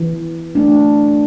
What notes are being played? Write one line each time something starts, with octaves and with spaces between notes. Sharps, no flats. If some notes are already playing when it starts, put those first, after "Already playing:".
Already playing: E3
A3 D4